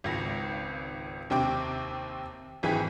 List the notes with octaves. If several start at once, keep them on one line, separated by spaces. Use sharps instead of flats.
G#1 C#2 A#6
D#2 C3 C4 G5 D6
G#1 E3 G#4 G5 B6